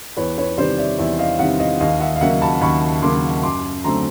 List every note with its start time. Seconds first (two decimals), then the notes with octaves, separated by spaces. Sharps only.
0.17 E2 B4 C#5
0.38 B4 C#5
0.58 C3 D#3 G3 C5 D5
0.78 D5 E5
0.99 E2 D5 E5
1.19 D#5 F5
1.39 C3 D#3 G3 E5 F#5
1.60 D#5 F5
1.81 D#2 D#5 F5
2.00 E5 F#5
2.16 F5
2.21 C#3 F#3 A#3 E5 F#5
2.42 A5 B5
2.61 D#2 B5 C#6
3.02 C#3 F#3 A#3 C6 D6
3.43 F#2 C6 D6
3.84 D3 F#3 A3 C4 A#5 C6